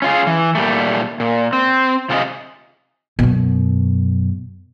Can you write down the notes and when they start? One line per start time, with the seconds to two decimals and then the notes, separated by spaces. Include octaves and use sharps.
0.02 C#4 F4 G#4
0.27 E3
0.55 A#2 G3 A3
1.20 A#2
1.53 C4
2.10 C3 F4 G#4 A#4 D#5
3.19 F#2 B2